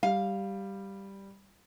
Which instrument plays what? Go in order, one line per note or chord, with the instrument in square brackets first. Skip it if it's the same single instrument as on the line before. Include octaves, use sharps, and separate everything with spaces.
[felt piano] G3 [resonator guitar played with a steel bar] F5